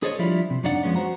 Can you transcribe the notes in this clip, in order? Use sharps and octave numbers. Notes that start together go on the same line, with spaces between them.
G#4 A4 C5 C#5 D#5
F3 G3 D4 E4
C3
F#2 D4 D#4 D5 F#5
F3 G#3 B3 C#4
F#4 C5 F#5 A#5